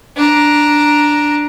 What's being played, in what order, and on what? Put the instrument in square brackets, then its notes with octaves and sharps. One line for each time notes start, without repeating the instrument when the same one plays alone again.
[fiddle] D4 A#5